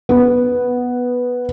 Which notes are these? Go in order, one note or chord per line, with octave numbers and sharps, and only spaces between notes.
B3